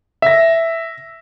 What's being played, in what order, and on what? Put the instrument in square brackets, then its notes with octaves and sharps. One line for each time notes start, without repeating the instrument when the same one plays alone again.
[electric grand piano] E5 A#6